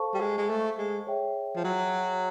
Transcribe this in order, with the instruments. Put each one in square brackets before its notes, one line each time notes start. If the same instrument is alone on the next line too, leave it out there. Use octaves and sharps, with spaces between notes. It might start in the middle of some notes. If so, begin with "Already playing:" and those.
Already playing: [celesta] A4 C5 F5 A5 C#6
[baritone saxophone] G3
G#3
G#3
A3
G#3
[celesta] G#4 C#5 E5 G5
[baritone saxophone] F3
F#3